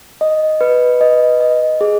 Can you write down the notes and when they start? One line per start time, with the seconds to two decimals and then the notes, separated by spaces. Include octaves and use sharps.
0.21 D#5
0.61 B4
1.01 D#5
1.40 D#5
1.81 G#4